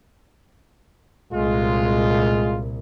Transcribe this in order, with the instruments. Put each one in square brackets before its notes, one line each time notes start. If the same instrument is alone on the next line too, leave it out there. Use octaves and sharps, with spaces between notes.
[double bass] C2 A#2 [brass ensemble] G#3 F4